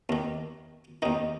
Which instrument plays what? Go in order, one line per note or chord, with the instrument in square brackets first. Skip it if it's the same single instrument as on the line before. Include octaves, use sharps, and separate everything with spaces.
[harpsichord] D#2 D#3
D#2 D#3 D#4